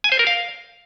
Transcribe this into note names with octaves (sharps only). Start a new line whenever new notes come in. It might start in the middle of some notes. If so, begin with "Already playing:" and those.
G#5
C5
A#4
F5